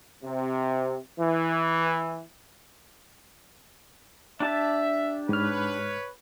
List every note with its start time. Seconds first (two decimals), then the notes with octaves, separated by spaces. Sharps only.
0.23 C3
1.19 E3
4.40 D4 G4 E5 A5
5.29 G#2 B4 C#5 F6